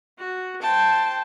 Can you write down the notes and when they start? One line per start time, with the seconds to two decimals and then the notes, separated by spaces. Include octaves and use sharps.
0.18 F#4
0.62 C5 G5 A5